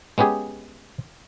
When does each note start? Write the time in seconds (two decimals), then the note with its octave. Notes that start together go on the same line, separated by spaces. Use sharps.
0.18 G#3 B3 C#4 G4 G#4